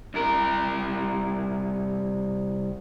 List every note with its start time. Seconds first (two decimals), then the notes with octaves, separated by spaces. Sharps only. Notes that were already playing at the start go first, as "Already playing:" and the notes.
0.14 C2 A#4